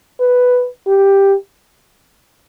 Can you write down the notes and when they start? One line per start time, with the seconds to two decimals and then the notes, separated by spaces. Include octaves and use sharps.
0.20 B4
0.87 G4